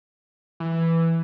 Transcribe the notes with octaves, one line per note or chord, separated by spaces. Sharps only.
E3